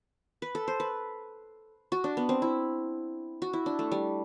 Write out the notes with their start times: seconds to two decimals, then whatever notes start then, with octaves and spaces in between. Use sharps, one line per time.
0.42 B4
0.55 A4
0.68 C5
0.80 B4
1.92 F#4
2.04 D4
2.17 B3
2.29 C4
2.42 E4
3.42 F#4
3.53 E4
3.66 D4
3.79 A3
3.92 G3